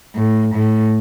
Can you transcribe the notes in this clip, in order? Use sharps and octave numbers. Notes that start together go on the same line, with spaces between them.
A2
A2